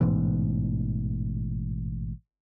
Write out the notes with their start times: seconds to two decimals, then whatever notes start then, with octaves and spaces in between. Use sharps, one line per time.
0.01 A1 G#2 B2 E3